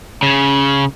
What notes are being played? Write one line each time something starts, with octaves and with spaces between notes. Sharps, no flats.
C#3